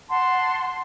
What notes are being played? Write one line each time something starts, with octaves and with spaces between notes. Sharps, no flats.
F#5 A5 C6